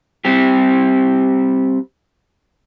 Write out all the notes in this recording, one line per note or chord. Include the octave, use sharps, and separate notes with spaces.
G3 C4 G4